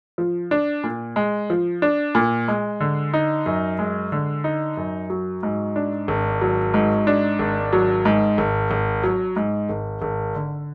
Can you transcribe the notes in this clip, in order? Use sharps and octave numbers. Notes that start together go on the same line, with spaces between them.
F3
D4
A#2
G#3
F3
D4
A#2
G#3
D3
D#4
F#2
G#3
D3
D#4
F#2
F#3
G#2
D4
G#1
F#3
G#2
D4
G#1
F#3
G#2
G#1
G#1
F#3
G#2
G#1
G#1
D3